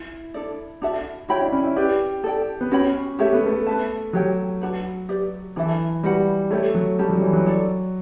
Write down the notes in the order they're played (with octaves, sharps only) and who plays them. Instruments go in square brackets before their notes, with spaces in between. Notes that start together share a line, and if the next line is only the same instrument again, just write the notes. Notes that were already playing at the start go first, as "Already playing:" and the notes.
Already playing: [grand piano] E4
[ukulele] D4 A4 D5
D4 F#4 A4 E5
[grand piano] E4 [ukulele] F#4 C#5 G5 B5
[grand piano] D4
C#4
E4
[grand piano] G4 [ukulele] B4 D5 G5
[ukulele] A4 D5 G5
[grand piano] B3
[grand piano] C#4 [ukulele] F#4 C#5 G5 B5
[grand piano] A3 [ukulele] G4 C#5 E5
[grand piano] B3
A3
[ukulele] B4 E5 A5
[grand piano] F#3 [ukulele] G4 C#5 G5
[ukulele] D4 F#4 B4
G4 B4 D5
[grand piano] E3 [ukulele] D4 A4 E5
[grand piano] G3 [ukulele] F#4 B4 F#5 B5
[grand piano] A3 [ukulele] E4 G4 C#5
[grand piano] F#3
[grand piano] G3 [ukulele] C#4 G4 D5 A5
[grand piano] F#3
E3
F#3
[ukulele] D4 A4 D5